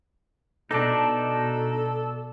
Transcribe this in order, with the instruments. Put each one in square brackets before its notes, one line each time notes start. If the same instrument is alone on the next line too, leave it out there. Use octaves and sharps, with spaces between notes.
[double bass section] B2 [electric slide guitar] D4 D#4 [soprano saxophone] A4 [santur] D5 A5